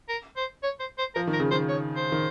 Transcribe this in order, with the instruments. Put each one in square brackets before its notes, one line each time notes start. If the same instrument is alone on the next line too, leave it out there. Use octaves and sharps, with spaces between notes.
[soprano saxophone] A#4
C5
C#5
C5
C5
[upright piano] F3 [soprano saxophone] A#4
[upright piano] D#3
[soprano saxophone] A#4
[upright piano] C#3
[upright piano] D#3 [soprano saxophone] C5
[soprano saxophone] C#5
C5
[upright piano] D#3